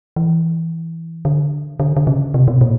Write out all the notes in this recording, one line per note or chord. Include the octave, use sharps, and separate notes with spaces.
E3
D3
D3
D3
C#3
C3
B2
A#2